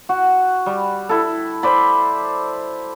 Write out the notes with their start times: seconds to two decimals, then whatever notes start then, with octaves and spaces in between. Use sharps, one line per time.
0.09 F#4
0.66 G3
1.09 E4 A4
1.63 C5 D5 B5